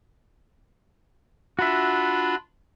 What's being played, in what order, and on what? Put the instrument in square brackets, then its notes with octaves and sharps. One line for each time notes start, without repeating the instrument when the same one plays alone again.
[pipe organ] D4 F4 B5 [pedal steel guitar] F#4 E5